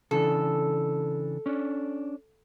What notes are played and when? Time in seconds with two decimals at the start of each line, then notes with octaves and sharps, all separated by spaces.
0.11 C#3 E3 D4 A4
1.46 C#4 D4